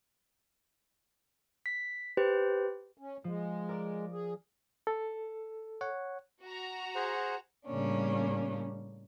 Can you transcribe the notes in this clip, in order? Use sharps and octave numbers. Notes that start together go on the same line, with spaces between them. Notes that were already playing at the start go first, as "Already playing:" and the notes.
B6
G4 B4 C5
C#4
F3 G#3
A#4 D5
G#4
A4
C#5 F#5
F#4 A#5
G#4 C5 F#5
A2 C#3 G3 A#3 C#4 D4